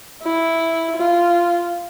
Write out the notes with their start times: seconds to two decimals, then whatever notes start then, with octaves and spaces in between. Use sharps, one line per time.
0.23 E4
0.96 F4